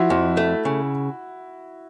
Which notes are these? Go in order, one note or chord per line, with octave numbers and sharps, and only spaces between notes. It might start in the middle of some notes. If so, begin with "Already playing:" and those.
Already playing: F3 E4 F#4
F2
A3
C#3